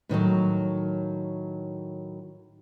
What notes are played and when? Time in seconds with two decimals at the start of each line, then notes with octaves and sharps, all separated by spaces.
0.09 A2 D#3 F3 F#3